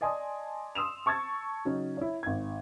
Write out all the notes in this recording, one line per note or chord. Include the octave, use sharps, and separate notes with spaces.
D5 D#5 G#5 A5 C6 D#6
C6 D#6 E6 E7 F7
A5 C#6 E6 G#6 A6
C#3 F#3 C#4 D#4
E4 C#5
G#1 G#6